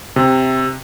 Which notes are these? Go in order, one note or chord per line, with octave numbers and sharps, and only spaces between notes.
C3